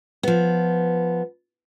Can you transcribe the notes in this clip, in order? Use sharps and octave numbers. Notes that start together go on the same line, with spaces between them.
F3 B3